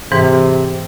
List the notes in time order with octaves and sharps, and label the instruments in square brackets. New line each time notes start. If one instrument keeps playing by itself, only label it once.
[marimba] G#2 E3 [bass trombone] C3